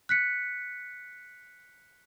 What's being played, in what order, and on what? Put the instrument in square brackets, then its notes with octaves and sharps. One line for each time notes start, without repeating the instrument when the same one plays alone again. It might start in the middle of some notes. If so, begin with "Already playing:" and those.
[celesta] F#6 B6 C#7